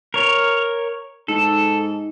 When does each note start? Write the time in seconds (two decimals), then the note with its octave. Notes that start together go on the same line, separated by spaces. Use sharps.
0.14 A#4 C#5
1.28 G#2 A4